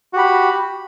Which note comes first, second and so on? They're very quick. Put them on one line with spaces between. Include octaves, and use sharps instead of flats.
F#4 G4 B5